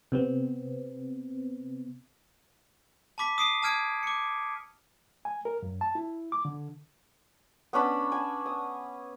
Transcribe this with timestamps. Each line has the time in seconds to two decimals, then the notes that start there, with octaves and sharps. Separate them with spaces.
0.12 C3 B3 C4
3.18 A5 B5 D6 B6
3.38 D#6 C7 D7 D#7
3.62 A5 D#6 F6 G#6 D7
4.03 D6 C#7
5.25 G#5
5.45 A#4
5.63 F#2
5.81 A5
5.95 E4
6.32 D6
6.45 D3
7.73 B3 C#4 D4 B5
8.12 G#5
8.46 D#6